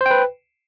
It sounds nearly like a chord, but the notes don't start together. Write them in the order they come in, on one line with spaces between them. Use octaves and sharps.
C5 G5 B4